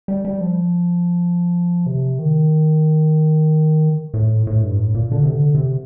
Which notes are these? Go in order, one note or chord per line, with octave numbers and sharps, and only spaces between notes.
G3
G3
F3
C3
D#3
A2
A2
G2
A2
A#2
D3
C3
D3
C3